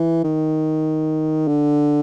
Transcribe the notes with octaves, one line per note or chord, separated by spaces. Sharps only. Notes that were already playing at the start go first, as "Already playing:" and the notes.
Already playing: E3
D#3
D3